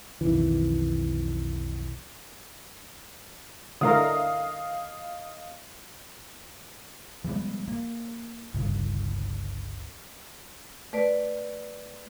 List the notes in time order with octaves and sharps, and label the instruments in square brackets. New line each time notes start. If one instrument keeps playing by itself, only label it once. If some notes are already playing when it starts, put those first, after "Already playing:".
[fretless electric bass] B1 F2 D#3 E3
[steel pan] D3 A3 A#4 [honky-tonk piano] D#5 F5 D#6
[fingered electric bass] F3 G3 G#3 B3
A#3
G1 C#2 G2 D3
[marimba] A3 B4 D5